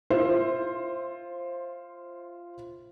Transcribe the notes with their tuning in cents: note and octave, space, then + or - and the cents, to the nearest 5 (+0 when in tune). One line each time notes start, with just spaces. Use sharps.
F4 -10 C5 +15 E5 +0